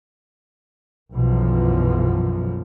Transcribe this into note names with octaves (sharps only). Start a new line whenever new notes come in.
B1 F#2 B2 E3 F3